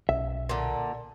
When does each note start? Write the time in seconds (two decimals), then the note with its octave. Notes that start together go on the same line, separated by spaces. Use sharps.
0.09 B1 C#4 E5
0.49 A#2 D3